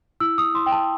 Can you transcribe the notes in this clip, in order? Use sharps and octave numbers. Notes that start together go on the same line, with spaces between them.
E4 E6
D#6
E4 C6
G5
A5